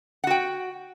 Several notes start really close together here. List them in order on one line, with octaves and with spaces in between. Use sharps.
F#5 F#4 G5